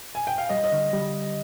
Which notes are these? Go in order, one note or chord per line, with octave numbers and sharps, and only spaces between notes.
G#5
G5
F5
G3 D#5
D#5
D3
G3